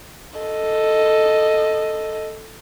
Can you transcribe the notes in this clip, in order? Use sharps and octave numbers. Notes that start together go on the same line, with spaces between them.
A4 D#5